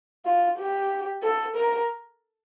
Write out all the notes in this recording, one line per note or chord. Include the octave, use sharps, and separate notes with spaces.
F4
G4
A4
A#4